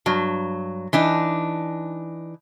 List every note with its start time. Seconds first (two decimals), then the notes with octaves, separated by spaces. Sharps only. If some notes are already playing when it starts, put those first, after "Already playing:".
0.06 G2 F#3
0.93 E3 D4 D#4